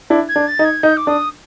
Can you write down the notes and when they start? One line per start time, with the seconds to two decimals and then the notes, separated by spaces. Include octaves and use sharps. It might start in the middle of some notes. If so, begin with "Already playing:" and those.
0.10 D4 E4
0.29 G#6
0.36 D4
0.48 A6
0.59 D#4
0.65 G#6
0.83 D#4 G6
0.97 D6
1.07 D4 D#6